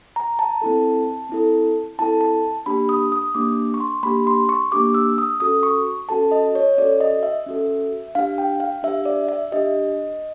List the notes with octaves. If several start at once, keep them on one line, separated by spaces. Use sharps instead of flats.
A#5
A5
C4 E4 A4
C4 E4 A4
C4 E4 A4 A5
A5
A#3 D4 G4 B5
D#6
D#6
A#3 D4 G4 D6
C#6
C6
A#3 D4 G4 B5
C6
C#6
A#3 D4 G4 D6
E6
D#6
C#4 F#4 A4 D#6
C#6
C#4 F#4 A4 A5
D#5
C#5
C#4 F#4 A4 D5
D#5
E5
C#4 F#4 A4
D4 G4 F5
G5
F5
D4 G4 E5
D5
E5
D4 G4 D#5